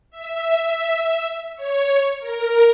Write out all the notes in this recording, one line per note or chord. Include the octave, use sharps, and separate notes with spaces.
E5
C#5
A#4